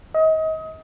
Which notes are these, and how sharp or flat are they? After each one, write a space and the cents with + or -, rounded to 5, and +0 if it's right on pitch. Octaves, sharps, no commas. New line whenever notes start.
D#5 +30